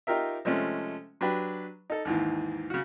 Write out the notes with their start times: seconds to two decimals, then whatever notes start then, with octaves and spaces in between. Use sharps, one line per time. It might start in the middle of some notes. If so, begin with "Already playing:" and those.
0.07 D#4 F4 G4 A#4 E5
0.45 C3 F3 G#3 A3 C#4
1.21 F#3 D4 G4 B4 B5
1.90 D#4 A4
2.05 D#2 G#2 E3
2.70 C#3 F#4